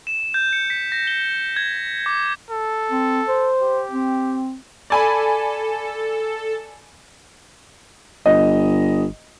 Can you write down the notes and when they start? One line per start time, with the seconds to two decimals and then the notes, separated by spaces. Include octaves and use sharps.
0.07 E7
0.34 G6
0.53 C#7
0.70 B6
0.92 A#6
1.07 G7
1.56 G#6
2.06 D6
2.50 A4
2.91 C4
3.28 C5
3.61 G4
3.91 C4
4.90 A4 D5 G#5 B5
8.26 G1 D#5